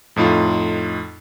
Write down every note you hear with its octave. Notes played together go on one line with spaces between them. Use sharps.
F2 A2 D#4 F4